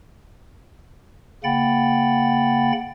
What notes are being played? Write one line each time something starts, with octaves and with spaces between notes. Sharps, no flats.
C#3 A#3 F#5 G5 B5 A6